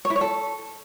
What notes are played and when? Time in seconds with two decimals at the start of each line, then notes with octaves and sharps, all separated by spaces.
0.05 C#5
0.10 E4
0.16 C#5
0.21 A4